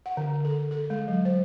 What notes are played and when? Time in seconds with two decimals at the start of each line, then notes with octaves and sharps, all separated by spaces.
0.06 F#5
0.17 D3
0.45 A4
0.71 A4
0.90 G#3
1.08 F#3
1.25 C5